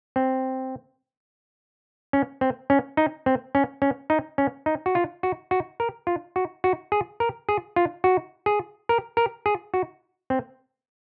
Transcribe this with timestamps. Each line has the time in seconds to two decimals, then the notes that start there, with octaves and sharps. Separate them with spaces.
0.16 C4
2.13 C#4
2.41 C4
2.70 C#4
2.97 D#4
3.26 C4
3.55 C#4
3.82 C#4
4.10 D#4
4.38 C#4
4.66 D#4
4.86 F#4
4.95 F4
5.23 F#4
5.51 F#4
5.80 A#4
6.07 F4
6.36 F#4
6.64 F#4
6.92 G#4
7.20 A#4
7.49 G#4
7.76 F4
8.04 F#4
8.46 G#4
8.89 A#4
9.17 A#4
9.46 G#4
9.74 F#4
10.30 C4